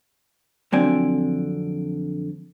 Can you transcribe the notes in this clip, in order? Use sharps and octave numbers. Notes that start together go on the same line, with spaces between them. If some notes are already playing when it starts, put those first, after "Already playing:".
F2 D3 F#3 C4 D5 G#5